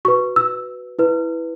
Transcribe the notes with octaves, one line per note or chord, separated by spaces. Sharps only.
F#4 B4 C#6
E6
E4 B4